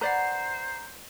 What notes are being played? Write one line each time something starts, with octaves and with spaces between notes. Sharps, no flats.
B4 C5 D5 F#5 A#5 C7